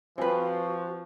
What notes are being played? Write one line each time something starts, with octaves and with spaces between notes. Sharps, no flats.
F3 C4 F#4 G#4 B4